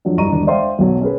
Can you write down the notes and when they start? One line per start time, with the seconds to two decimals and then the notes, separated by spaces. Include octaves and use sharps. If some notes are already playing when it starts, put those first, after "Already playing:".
0.05 F2 F#3 D4
0.17 C2 G2 D#5 A#5 C#6 D#7
0.31 E1 D3 D4
0.47 C5 D5 E5 F5 G5 C6
0.79 B1 B2 F#3
1.01 C#4 G#4 B4